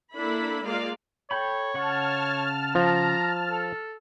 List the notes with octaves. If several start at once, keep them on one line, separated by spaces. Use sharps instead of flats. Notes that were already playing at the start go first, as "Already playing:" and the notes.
A#3 D4 E4 A4 B5
G#3 A#3 F4 D5 F5
A4 C#5 G5 B5
C#3 F#5 A5 C#6 F6
F3 A#5
A4